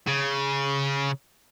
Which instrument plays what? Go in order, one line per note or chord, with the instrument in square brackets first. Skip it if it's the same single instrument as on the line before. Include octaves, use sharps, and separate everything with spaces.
[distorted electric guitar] C#3